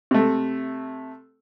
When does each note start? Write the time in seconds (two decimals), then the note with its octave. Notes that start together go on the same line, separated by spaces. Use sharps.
0.11 C3 A3